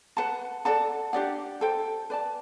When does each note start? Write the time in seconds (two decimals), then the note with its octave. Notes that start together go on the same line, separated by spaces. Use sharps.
0.17 B4 F#5 A5
0.65 A4 D5 F#5 A5
1.13 D4 G4 D5 F#5
1.61 A4 C5 G5
2.10 B4 D5 A5